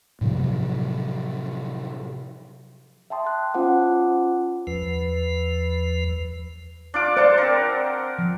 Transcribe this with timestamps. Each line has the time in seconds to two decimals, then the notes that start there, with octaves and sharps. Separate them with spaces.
0.21 A2 C3 F3 F#3
3.10 E5 G5 A5 C6 D#6
3.27 F#6
3.54 C#4 F4 C5 F#5 A5 D6
4.67 E2 F3 B4
6.94 D4 F4 D6
7.17 C5 D5 F#5 A5 C6
7.38 C4 A#4
8.18 F3